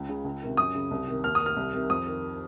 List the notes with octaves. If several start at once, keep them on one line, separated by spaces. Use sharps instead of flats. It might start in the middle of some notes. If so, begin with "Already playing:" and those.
Already playing: C#2
C#3
C#2
C3 D#3
F#2 D#6
C#3
C2
C3 D#3
D#2 F6
D#6
D#3
F6
C2
C3 D#3
F2 D#6
D#3